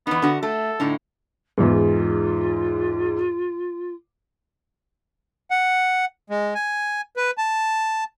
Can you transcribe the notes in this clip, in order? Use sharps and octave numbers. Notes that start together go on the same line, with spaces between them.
E2 B3 D#4
D3 F#4
A3 A4
A2 D3 D#4
E2 G#2 F4
F#5
G#3
G#5
B4
A5